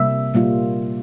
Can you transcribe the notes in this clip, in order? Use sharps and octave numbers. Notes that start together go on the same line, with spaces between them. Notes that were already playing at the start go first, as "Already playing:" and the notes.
Already playing: C3 G3 A#3 E5
A#2 G3 A#3 F4